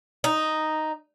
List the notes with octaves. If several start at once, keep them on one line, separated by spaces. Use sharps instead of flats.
D#4